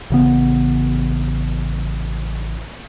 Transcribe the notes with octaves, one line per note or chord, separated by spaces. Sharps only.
A1 C#3 B3